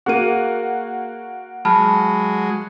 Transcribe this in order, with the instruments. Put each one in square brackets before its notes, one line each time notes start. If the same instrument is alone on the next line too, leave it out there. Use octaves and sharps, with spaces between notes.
[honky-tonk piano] A#3 F#4 [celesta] G#4 D#7
[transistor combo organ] F#3 G#3 [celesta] A5 B5 F6